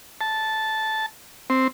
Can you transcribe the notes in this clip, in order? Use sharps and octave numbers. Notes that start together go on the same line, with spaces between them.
A5
C4